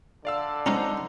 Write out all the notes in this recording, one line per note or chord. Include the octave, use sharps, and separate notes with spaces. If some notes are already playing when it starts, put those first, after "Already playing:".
D3 D5 F5 E6
C#4 D#4 F4 C5 F#5 A#5